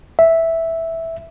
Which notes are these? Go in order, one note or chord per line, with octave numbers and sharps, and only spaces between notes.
E5